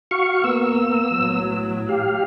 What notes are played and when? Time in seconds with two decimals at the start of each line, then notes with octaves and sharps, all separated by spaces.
0.11 F#4 F5 C#6
0.44 A#3 B3 E6
1.16 A2 F#3
1.89 G4 F5